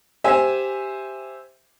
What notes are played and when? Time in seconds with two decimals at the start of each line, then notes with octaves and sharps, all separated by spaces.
0.24 G4 C5 E5 G#5